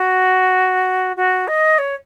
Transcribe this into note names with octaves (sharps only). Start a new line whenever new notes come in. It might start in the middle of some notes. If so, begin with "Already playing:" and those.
Already playing: F#4
F#4
D#5
C#5